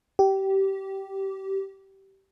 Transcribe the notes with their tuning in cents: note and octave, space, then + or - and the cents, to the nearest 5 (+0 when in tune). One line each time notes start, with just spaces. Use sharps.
G4 -20